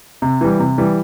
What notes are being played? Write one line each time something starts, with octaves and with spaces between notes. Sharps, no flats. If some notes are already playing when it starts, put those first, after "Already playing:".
C3
E3 G3
C3
E3 G3